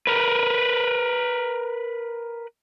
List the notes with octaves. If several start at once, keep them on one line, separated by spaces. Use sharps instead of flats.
A#4 B4